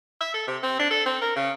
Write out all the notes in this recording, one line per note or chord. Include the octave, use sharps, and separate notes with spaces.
E5
A4
C3
C4
D4
A4
C4
A#4
C#3